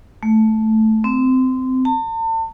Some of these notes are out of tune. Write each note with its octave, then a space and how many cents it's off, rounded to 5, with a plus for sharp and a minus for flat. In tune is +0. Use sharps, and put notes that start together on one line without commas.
A3 -5
C4 -20
A5 +40